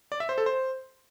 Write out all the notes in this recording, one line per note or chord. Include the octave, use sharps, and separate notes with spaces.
D5
E5
C5
A4
C5